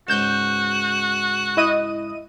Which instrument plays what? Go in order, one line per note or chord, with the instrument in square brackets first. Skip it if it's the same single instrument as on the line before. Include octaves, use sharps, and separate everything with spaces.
[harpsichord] C#2 G#2 [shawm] F#4 [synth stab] G6 E7
[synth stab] E4 D#5 D#7